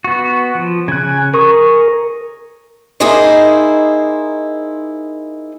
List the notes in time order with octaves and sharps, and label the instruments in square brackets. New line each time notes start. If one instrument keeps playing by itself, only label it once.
[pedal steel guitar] B3 F#4
F3
[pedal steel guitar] C#3 F#6 [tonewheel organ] G#5
[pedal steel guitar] G#4 C#6 D#6 [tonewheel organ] A#4
[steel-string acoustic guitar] A#3 D#4 E4 G#4 C5 D#5